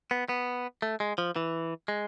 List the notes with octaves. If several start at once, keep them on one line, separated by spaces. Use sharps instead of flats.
B3
B3
A3
G#3
F3
E3
G#3